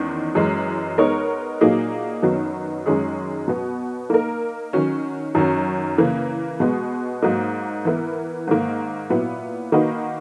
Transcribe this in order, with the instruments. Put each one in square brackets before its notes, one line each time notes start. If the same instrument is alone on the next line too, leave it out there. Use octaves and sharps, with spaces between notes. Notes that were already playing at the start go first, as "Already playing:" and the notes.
Already playing: [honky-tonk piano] E2 D#3 G#3 C#4
F#2 E3 G#3
G#3 B3 D#4 A#4 C#5
A#2 F#3 A#3 D#4 G#4
F#2 D#3 F#3 B3 D#4
F#2 D#3 G#3 C#4 G#4
B2 F#3 B3
A#3 D#4 A#4
D#3 F#3 C#4
F#2 D#3 F#3 C#4
C#3 E3 A#3
B2 G#3 B3
G#2 F#3 A#3 D#4
E3 B3 E4 A#4
G#2 D#3 A#3
A#2 F#3 B3 E4 B4
D#3 A#3 D#4 F#4 B4